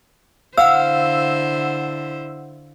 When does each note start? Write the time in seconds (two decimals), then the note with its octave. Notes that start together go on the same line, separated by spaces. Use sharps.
0.57 D3 E4 C5 F5 F#5 E6